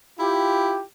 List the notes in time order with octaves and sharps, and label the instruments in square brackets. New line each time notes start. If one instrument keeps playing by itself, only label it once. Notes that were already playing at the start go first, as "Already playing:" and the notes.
[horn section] E4 F4 G4